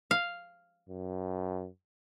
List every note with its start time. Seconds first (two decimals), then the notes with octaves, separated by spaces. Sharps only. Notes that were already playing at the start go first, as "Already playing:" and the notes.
0.11 F5
0.89 F#2